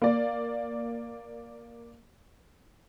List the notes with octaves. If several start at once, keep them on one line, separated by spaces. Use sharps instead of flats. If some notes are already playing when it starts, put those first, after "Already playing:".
A#3 D5